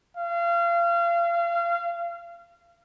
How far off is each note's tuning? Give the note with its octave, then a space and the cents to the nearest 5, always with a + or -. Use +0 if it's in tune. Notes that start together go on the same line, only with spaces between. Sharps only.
F5 -30